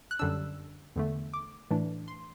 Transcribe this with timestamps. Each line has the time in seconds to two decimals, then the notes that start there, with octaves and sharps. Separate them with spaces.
0.11 F#6
0.19 F#2 D3 G3 D4 E6
0.96 E2 D3 A3
1.33 D6
1.71 A2 E3 A3 D4
2.08 C6